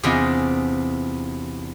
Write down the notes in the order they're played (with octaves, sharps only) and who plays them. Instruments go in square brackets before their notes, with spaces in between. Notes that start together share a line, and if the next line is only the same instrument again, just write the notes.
[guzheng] E2 C3 D4 F4 D#5 G#5